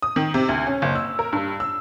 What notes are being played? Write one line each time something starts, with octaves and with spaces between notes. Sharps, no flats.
D#6
D#3
C3
D2
C#4
F#1
E6
A#4
G2
E6